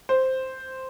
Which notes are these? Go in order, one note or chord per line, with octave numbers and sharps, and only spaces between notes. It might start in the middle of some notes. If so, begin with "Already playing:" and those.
C5